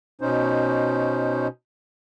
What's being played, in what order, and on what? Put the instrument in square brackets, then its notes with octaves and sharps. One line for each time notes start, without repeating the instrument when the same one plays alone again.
[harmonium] B2 C#4 D#4 C5